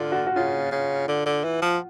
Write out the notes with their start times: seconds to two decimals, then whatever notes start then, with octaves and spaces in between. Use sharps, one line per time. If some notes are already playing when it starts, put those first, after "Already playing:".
Already playing: D3 F4
0.12 F#4
0.27 F#4
0.36 C#3 F4
0.72 C#3
1.08 D3
1.26 D3
1.44 E3
1.62 F3